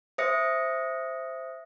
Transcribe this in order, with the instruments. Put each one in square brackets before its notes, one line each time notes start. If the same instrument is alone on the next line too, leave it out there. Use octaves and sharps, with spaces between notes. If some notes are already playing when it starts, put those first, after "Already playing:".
[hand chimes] C5 E5 D#6 A#6 C#7